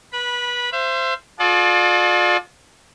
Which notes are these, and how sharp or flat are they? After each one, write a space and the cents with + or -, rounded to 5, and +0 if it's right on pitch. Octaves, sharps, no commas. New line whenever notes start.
B4 -25 B5 -15
C5 +0 E5 +40
F4 +35 A4 -40 D5 +30